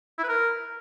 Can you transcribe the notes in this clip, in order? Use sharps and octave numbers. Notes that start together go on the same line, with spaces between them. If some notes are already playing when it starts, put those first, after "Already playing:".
E4
B4
A#4